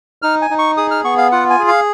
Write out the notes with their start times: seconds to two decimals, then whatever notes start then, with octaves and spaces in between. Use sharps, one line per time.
0.22 D#4 F6
0.42 G#5
0.50 D#4
0.59 C#6
0.77 G#4 D#6
0.91 F6
1.04 B3 C#6
1.18 F5
1.31 F4 F#5
1.50 G#5
1.59 G#4
1.68 F5